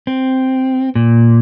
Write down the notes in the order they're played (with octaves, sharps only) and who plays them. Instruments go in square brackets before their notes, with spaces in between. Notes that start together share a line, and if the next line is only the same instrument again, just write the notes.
[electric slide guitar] C4
A#2